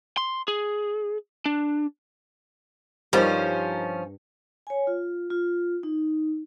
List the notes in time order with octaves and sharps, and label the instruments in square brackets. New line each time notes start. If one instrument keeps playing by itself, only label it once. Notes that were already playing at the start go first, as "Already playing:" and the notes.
[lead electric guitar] C6
G#4
D4
[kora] G2 [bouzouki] F3 C#4 [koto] G3 [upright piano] D#4 A#4 C5
[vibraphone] C#5 G#5
F4
F4
D#4